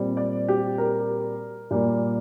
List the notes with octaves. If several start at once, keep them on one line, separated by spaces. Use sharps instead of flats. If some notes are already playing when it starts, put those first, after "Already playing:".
Already playing: A#2 G3 C4
D5
G4
A#4
A#2 G3 A#3